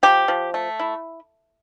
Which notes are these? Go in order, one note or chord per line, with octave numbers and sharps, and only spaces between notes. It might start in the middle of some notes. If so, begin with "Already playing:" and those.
F3 G4
F3
A3
E4